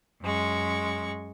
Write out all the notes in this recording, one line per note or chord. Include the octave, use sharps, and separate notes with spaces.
F#2 G#3 C#6